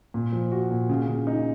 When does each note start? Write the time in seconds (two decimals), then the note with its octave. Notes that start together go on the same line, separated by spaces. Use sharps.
0.14 A#2
0.32 F3
0.52 F#4
0.71 A#2
0.89 C#3
1.08 C#3
1.27 D#4